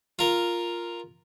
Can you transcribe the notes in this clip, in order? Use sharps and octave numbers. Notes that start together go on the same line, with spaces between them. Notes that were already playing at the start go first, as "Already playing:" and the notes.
F4 A#4